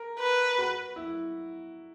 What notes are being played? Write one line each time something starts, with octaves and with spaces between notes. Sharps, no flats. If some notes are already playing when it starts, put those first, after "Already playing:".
Already playing: A#4
B4
F#4
E4